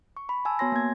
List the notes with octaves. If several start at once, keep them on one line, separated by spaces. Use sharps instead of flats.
C#6
B5
G#5 A5 E6
B3 F#4 C#5 G#5 C6 A#6
A#3 G#6